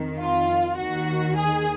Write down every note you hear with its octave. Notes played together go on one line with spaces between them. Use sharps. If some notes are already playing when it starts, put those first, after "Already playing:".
Already playing: F2 D#3
F4
D#2 D#3 F#4
G#4